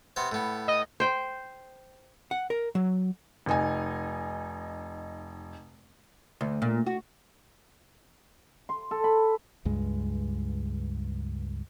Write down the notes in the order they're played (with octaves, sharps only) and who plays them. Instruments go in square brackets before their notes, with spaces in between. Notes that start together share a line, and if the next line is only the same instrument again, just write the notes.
[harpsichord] C3 B3 C5
A2 B3
[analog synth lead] D#5
[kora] C5 G5
[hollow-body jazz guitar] F#5
A#4
F#3
[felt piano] F1 D#4 G#5
[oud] D2
A#2
F#4
[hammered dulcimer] C6
A4
B5
[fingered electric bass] C#2 G2 G#3